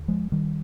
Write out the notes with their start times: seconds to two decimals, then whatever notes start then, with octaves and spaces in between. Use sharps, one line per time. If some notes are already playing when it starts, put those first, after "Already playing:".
Already playing: D#2 D3
0.08 F3 G#3
0.32 D#3 G3